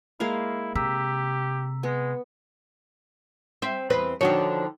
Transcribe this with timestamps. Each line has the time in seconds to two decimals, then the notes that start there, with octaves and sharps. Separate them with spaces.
0.20 G#3 A#3 E4 F5
0.76 C3 G4 A#5 E6 B6
1.83 G#3 B3
3.62 C4 E5
3.90 E2 C4 B4
4.21 D3 D#3 F3 D4 F#4 C#5